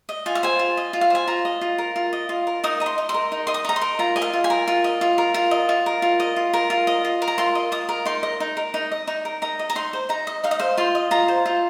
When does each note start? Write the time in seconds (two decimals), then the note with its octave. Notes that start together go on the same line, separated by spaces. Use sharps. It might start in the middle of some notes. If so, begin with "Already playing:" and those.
0.09 D#5
0.26 F4 G#5
0.35 F5
0.43 C5 G#5
0.59 F4
0.77 D#5
0.93 F4
1.01 F5
1.10 C5 G#5
1.28 F4 A#5
1.45 D#5
1.61 F4
1.78 A#4
1.96 F4
2.13 D#5
2.29 F4
2.47 A#4
2.64 D#4 D#6
2.80 D#5 A#5
2.86 C6
2.98 D#4
3.09 C6
3.14 A#4
3.32 D#4
3.47 D#5 C6
3.54 D#6
3.65 D#4 A#5
3.76 C6
3.81 A#4
3.99 F4 A#5
4.16 D#5 G#5
4.22 F5
4.33 F4
4.44 G#5
4.50 A#4
4.67 F4
4.84 D#5
5.01 F4
5.18 A#4
5.34 F4
5.51 D#5
5.69 F4
5.86 A#4
6.02 F4
6.20 D#5
6.36 F4
6.53 A#4
6.70 F4
6.87 D#5
7.05 F4
7.22 A#4
7.28 A#5
7.38 F4 C6
7.55 D#5
7.72 F4 D#6
7.89 A#4
8.05 D#4 C6
8.23 D#5
8.40 D#4
8.57 A#4
8.74 D#4
8.91 D#5
9.07 D#4
9.25 A#4
9.42 D#4 A#5
9.59 D#5
9.70 A#5
9.75 D#4 C6
9.93 C5
10.09 D#4 A#5
10.27 D#5
10.44 D#4 F5
10.51 D#5
10.59 C5 F5
10.77 F4 C6
10.95 D#5
11.11 F4 A#5
11.28 C5
11.46 F4